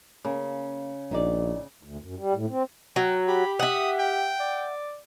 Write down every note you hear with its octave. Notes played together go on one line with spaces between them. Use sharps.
C#3 A#3
A#1 A#2 D#4 D5
D2
F#2
G3
A2
C4
F#3 G5
G4 B5
E5 F#5 D#6
G5
D5